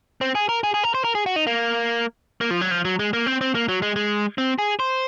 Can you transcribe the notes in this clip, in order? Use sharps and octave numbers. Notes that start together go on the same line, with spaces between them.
C4
G#4
A#4
G#4
G#4
A#4
C5
A#4
G#4
F#4
D#4
A#3
A#3
F3
F#3
F3
F#3
G#3
A#3
C4
C4
A#3
F#3
G#3
G#3
C4
G#4
C5